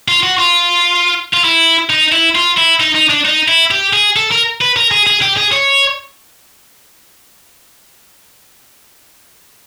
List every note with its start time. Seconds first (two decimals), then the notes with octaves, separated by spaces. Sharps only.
0.08 F4
0.23 F#4
0.38 F4
1.34 F4
1.44 E4
1.90 D#4
2.12 E4
2.35 F4
2.57 E4
2.80 D#4
2.95 D#4
3.10 D4
3.25 D#4
3.48 E4
3.71 G4
3.93 G#4
4.16 A4
4.31 A#4
4.61 B4
4.76 A#4
4.91 G#4
5.07 G#4
5.22 G4
5.36 G#4
5.52 C#5